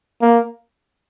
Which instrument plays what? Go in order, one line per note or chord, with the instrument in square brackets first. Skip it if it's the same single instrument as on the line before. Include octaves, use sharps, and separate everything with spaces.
[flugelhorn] A#3